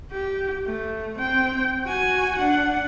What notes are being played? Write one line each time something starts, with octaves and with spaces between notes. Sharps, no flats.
G4
A3
C4 G5
F#4 G#5
D4 F#5